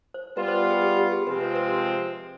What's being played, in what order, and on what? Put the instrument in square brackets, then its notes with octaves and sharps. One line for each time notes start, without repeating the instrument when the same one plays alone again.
[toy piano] C5
[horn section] G3 B3 F4 [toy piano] B4
[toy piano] C5
G#4
G4
G4
G#4
[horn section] C3 F3 G#3 C4 [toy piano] B4
[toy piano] B4
B4